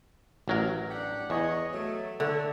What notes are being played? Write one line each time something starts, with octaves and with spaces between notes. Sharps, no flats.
A1 F#3 A#4
D4 G4 F#5
E2 C#5 D#5
F#3 A3
D3 C#5 E5